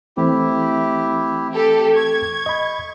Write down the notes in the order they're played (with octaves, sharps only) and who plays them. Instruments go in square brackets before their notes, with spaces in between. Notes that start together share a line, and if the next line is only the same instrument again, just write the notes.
[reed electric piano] E3 A3 C4 [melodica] E4 G4
[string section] G4 A4
[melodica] C#6 [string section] G#6
[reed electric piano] D#5 B5